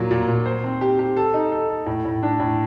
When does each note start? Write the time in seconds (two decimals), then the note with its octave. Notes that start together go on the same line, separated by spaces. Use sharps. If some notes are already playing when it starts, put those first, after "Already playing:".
Already playing: A#2 F#3
0.11 A#2
0.28 A#2
0.46 C5
0.64 C4
0.81 G4
0.99 G4
1.16 A4
1.34 D#4
1.52 A4
1.70 A4
1.86 A2
2.05 A2
2.23 D4
2.40 A2